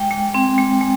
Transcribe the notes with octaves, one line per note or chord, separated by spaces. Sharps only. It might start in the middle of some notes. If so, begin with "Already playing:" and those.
Already playing: G#3 G5
G#3
C4
G#3
G#3